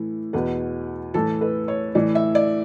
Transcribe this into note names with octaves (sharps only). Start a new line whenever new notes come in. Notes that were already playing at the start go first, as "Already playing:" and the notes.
Already playing: A2 E3
E2 B2 B4
A2 E3 A4
B4
C#5
A2 E3 D5
E5
D5